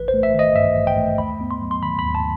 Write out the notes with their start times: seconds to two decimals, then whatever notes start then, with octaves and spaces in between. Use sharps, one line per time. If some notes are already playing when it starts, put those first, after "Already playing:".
Already playing: A1 B4
0.08 C5
0.14 A3
0.23 E5
0.34 D#3 D#5
0.56 G2 E5
0.77 A1
0.87 G5
0.97 A3
1.18 D#2 B5
1.41 B3
1.51 C6
1.62 F#3
1.71 C6
1.82 D#3 B5
1.99 D#2 B5
2.15 A5